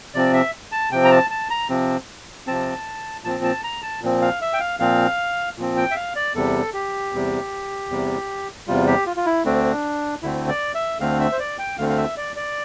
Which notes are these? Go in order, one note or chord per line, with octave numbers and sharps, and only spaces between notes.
C3 F3 C4 D5
E5
A5
C3 F3 C4 G5
A#5
A5
A5
A#5
C3 F3 C4
C3 F3 C4 A5
A#2 F3 C4 A5
A5
A#5
A5
A#2 F3 C4
F5
E5
G5
F5
A#2 F3 C4 F5
A#2 F3 C4
G5
E5
F5
D5
E2 C3 G3 A4
G4
E2 C3 G3
E2 C3 G3
E2 C3 G3 F4
G4
F4
F4
E4
D2 D3 A3 C4 D4
D2 D3 A3 C4 E4
D5
E5
D2 D3 A3 C4 F5
E5
C5
D5
G5
D2 D3 A3 C4 F5
F5
E5
D5
D5